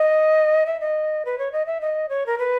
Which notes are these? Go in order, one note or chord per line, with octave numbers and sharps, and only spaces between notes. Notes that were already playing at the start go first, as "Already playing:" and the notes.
Already playing: D#5
E5
D#5
B4
C#5
D#5
E5
D#5
C#5
A#4
B4